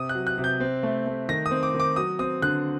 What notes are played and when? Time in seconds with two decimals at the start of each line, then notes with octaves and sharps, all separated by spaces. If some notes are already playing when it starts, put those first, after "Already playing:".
Already playing: C3 D#6
0.09 F#6
0.15 F#3
0.27 F#6
0.38 C3
0.44 G6
0.60 C4
0.83 A3
1.06 A3
1.28 D#3 A#6
1.46 D#6
1.51 C4
1.63 D6
1.74 D#3
1.80 D6
1.96 F#3 D#6
2.19 C4 D#6
2.42 D3 F#6